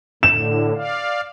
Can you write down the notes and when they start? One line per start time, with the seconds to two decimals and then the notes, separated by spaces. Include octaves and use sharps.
0.23 A2 D3 E7
0.75 D5 F5